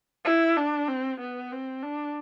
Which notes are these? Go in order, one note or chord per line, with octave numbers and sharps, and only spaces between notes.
E4
D4
C4
B3
C4
D4